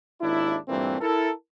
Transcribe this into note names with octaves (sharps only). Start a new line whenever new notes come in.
G#1 D#2 D4 E4
G2 A#2 E3 G3 A3 C4
E4 A4 A#4